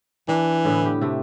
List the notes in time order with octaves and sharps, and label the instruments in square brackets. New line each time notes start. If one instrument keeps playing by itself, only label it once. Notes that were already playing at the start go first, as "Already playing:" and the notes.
[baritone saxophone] E3 [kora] D4
[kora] A2 D3 B3
G4
C3 A3